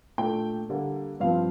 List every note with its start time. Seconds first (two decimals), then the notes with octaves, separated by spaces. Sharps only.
0.18 A#2 A3 D4 G5
0.69 D3 G3 A#3
1.20 G2 F3 C4 F5